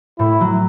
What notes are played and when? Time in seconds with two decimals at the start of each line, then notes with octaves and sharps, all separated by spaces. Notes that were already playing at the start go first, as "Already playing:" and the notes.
0.19 A2 E4
0.41 F#3